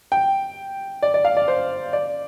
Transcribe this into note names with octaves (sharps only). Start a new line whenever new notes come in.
G5
D5
D5
F5
D5
C5
D5